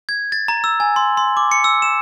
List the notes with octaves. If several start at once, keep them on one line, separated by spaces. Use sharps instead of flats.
G#6
A6
A#5
E6
G#5
C6
C6
D6
C#7
E6
E7